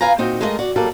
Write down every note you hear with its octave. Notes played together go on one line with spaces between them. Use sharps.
B3 F4 B4 F5 G#5 A#5
A#2 C4 D#4 F#4 G5
G#3 A3 E4 F4 A#4 D#5
F#4 D5
F#3 G3 A#3 A4